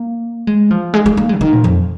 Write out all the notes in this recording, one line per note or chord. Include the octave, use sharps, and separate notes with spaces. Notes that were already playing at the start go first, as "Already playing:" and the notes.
Already playing: A#3
G#3
F3
G#3
G#3
A#3
G#3
C#3
D#3
A#2
F2